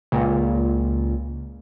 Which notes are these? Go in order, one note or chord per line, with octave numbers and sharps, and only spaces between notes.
C#2 A#2